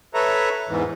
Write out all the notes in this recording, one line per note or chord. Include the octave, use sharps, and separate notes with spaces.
A4 B4 C#5 E5 A#5
E2 G#2 E3